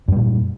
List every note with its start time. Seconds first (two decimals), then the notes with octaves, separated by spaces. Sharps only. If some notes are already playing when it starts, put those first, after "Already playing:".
0.08 F#2
0.12 G3
0.16 A#2